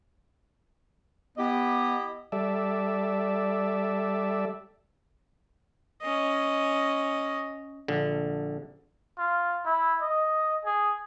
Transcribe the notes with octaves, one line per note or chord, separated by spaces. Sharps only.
B3 E4 G4 D#5
G3 A4 D5 E5
C#4 D#5
A#1 D3
F4
E4
D#5
G#4